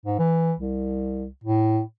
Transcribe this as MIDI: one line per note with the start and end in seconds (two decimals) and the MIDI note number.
0.06 0.18 44
0.19 0.53 52
0.59 1.26 36
1.44 1.80 45